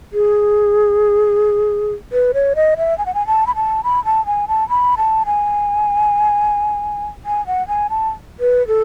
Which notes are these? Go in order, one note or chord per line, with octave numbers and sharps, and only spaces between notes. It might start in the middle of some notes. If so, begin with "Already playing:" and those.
G#4
B4
C#5
D#5
E5
G#5
F#5
G#5
A5
B5
A5
B5
A5
G#5
A5
B5
A5
G#5
G#5
F#5
G#5
A5
B4
A4